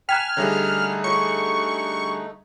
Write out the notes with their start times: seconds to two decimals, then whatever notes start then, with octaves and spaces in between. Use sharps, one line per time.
0.09 G5 G#5 A#5 F6 F#6 G#6 B6
0.37 D3 G3 A3 D#4 G#4 C#5 E5
0.57 D#5
1.04 F4 C#5 C#6